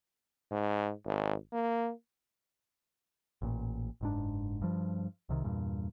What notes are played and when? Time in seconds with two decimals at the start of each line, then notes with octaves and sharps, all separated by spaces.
0.51 G#2
1.05 G#1
1.52 A#3
3.42 A1 A#2
4.01 F#1 G#2 D4
4.62 G2 F3
5.29 C2 C3 D#3
5.44 E2 G2 A#2